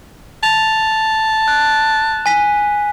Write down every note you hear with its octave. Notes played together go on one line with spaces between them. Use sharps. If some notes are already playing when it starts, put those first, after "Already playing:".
A5 F7
F#6
G#5 B6